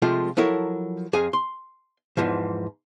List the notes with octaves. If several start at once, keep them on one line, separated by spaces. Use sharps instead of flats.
C3 F3 G#3 A3 F4
F3 F#3 E4 A4 A#4 C#5
F2 G#4 F5 G#5
C6
E2 G#2 E3 F3